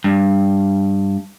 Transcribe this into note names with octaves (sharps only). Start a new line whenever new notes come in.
G2